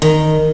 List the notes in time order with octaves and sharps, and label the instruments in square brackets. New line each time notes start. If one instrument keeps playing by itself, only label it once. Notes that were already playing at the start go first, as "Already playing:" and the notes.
[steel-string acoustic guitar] D#3